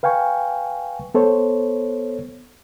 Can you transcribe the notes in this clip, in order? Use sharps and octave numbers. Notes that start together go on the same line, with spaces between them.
B4 F5 G5 G#5 C#6
B3 A4 C5 C#5